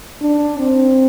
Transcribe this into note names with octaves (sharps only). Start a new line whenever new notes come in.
D4
C4